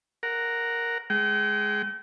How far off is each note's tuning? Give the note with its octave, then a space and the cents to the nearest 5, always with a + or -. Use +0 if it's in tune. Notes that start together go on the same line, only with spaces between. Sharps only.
A#4 +0 F#5 +0
G#3 +0 G5 -40